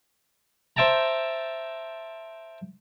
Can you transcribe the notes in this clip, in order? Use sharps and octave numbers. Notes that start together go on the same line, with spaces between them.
C5 E5 G5 A5 A#5